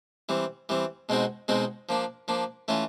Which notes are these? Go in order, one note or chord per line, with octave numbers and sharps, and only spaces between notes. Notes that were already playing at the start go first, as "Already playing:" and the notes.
E3 G3 C4
E3 G3 C4
B2 G#3 C4 D#4 F#4
B2 G#3 C4 D#4 F#4
F3 A#3 D4
F3 A#3 D4
E3 A3 C#4 F4